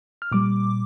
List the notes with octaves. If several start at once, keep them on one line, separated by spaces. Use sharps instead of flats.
F6
A#2 G3 D6